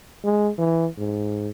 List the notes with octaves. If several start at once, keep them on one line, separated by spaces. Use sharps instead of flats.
G#3
E3
G#2